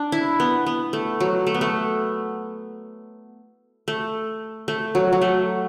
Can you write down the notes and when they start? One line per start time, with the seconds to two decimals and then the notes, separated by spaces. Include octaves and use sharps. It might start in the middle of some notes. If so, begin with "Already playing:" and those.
Already playing: D4
0.12 E4
0.40 B3
0.66 B3
0.93 A3
1.20 F#3
1.47 A3
1.54 B3
1.61 A3
3.88 A3
4.68 A3
4.95 F#3
5.13 F#3
5.22 A3